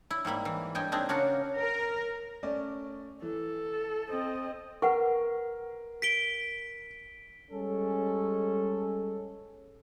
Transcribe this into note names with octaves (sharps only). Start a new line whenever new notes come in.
E4
G#2 G3 A#3 B5
E3
G2 D#5 G5 G#5
A#3 C4 D4 D#4 G#4
C#3 D4 F#4 A#4
A#4
A3 C#4 D5
E3 A4
C4 D#5
A#4 B4 F#5 C#6
B6 D7 G7
G3 G#3 C#4 A4